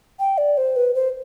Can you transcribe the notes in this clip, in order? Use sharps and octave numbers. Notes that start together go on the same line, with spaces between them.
G5
D5
C5
B4
C5